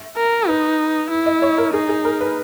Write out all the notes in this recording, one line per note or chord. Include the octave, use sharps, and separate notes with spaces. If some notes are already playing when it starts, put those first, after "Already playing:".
Already playing: E5
A#4
D#4 B4
E4
D#5
C#5
A#4
D#4 G#4
G#4
A#4
B4